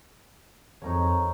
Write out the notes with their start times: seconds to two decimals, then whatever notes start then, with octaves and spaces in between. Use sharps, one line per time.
0.82 F2 D#4 A#4 C#5